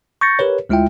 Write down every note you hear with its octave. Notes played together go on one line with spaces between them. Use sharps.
C#6 G6 A6 A#6 C#7
G4 A#4 B4 C#5
D2 G#3 E4 F4 E5 G5